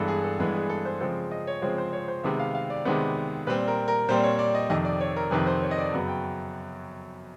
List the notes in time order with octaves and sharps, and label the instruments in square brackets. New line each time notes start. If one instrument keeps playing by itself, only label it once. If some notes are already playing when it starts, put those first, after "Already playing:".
Already playing: [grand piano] G2 E3 G#3 B3 A4
G#4
A4
G2 E3 G#3 B3 G#4
G#4
A4
C5
C#3 F3 G#3 C4 A4
D#5
C#5
C#3 F3 G#3 C4 C#5
C5
C#5
C5
C3 D#3 G#3 B3 E5
F5
F5
D5
C3 D#3 G#3 B3 C5
A#2 G3 C4 B4
A#4
A#4
A#2 G3 C4 C5
C#5
D5
D#5
F2 C3 D#3 D#5
D5
C#5
A#4
F2 C3 D#3 B4
C5
C#5
D#5
D5
F#2 C#3 F#3 B3
G5